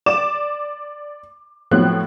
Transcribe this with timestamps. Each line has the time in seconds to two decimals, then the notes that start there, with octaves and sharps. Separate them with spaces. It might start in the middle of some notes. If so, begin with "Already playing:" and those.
0.06 D5 D6 E7
1.71 A2 F3 F#3 B3 C4 F#6